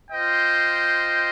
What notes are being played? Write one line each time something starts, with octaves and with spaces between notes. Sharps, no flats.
F4 C5 D#5 G5